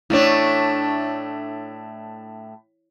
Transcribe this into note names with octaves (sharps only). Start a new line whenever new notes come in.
A2 A3 D4 E4 C#5